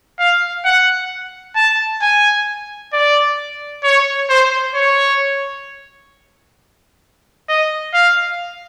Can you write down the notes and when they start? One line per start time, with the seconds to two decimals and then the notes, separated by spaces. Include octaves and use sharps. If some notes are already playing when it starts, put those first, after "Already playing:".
0.19 F5
0.65 F#5
1.56 A5
2.02 G#5
2.93 D5
3.84 C#5
4.29 C5
4.75 C#5
7.49 D#5
7.94 F5